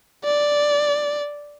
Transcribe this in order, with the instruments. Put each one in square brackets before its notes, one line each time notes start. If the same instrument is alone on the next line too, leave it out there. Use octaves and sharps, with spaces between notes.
[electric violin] D5